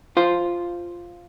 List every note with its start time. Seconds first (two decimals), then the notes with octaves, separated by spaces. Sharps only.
0.17 F4 C5